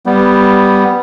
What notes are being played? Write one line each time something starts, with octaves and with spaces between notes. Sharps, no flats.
G3 B3